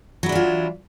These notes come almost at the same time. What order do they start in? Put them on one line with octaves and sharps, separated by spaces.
F#3 E4 D4 E3 F4